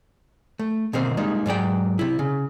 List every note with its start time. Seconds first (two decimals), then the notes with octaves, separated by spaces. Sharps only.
0.59 A3
0.93 B2 D3 D#3 A#3 C4
1.17 G3 G#3 A#3 D#4
1.46 G#2 F#3 D5 G5
1.99 C3 E4
2.19 C#3